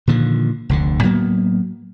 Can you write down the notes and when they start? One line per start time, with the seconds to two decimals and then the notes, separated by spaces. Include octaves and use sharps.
0.07 A#2 D3 D#3 F3
0.69 F1 D2 D3
1.03 A2 F#3 A#3 B3